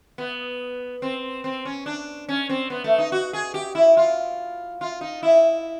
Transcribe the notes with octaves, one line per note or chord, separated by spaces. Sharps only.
B3
C4
C4
C#4
D4
C#4
C4
B3
A3
D#4
F#4
G#4
G4
E4
F4
F4
D#4
E4